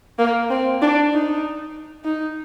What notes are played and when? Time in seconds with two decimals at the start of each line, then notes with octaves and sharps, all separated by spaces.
0.19 A#3
0.50 C4
0.82 D4
1.12 D#4
2.05 D#4